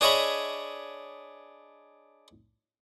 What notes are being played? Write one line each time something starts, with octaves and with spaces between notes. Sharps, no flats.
D4 G#4 C#5 D#5 E5 B5